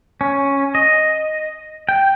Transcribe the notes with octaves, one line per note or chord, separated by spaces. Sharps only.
C#4
D#5
G5